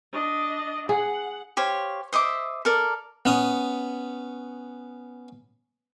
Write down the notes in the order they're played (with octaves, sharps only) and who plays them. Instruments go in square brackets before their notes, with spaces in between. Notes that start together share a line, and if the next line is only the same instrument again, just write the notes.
[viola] D4 D#5
[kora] G#4 [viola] F#5
[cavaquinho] G4 C5 C#5 F5
C5 D#5 E5 D6
A4 A#4 D5
[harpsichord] B3 C#4 D#6